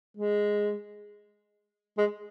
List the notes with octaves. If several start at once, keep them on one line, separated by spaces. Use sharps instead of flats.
G#3
G#3